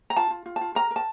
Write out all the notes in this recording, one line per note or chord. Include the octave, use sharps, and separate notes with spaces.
A#5
F4 A5
F4
F4
A5
F4
A#4 A#5
A#4
A5